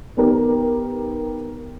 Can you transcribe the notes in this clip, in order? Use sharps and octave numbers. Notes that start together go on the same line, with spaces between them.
D#3 B3 G4 A#4